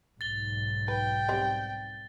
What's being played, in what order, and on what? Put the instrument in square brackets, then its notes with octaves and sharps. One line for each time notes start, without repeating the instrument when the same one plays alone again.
[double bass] B1 G#2 [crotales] A6 G7
[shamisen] B4 [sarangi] G5
[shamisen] G3 B3 C4